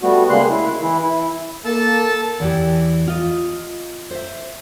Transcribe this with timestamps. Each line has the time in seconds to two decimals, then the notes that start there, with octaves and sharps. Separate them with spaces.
0.01 G3 A3 B3 F#4
0.30 C#3 G3 G#3 A#3 C6 F#6
0.50 E4
0.82 E3 E4
1.03 E4
1.65 A#3 A4 A#4 A5 E6
2.40 E2 E3 G4
3.07 F4 D#5
4.10 C5 E5